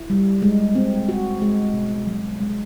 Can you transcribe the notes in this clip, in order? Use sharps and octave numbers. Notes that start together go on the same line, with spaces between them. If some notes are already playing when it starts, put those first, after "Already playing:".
Already playing: E4
G3
G#3
C4
F#4
G#3
B2
F#3
G#3